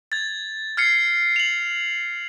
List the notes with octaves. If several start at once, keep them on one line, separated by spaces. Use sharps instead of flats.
G#6 A6
F6 G#6 C7 C#7
F7 F#7